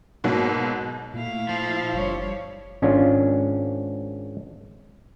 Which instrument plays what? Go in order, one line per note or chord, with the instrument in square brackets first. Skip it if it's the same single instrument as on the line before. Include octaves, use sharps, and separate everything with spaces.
[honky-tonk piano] G#2 B2 F#3 A#3
[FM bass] A#2 [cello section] A3 [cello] E4 F5
[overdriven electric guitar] F3
[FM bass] F#1 [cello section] G3 D4 C#5
[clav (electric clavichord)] G#1 C#4 D4 F4